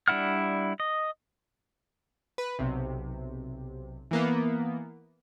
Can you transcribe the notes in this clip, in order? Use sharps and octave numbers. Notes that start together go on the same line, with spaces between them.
G3 D4 E4 F#5 F6
D#5
B4
B1 C3
E3 A#3 B3